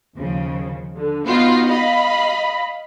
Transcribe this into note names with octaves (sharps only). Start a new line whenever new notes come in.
D#2 C#3 F3
D3
B3 D#4 F4 F#4
D#5 F5 B5